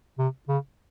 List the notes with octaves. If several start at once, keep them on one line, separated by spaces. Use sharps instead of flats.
C3
C#3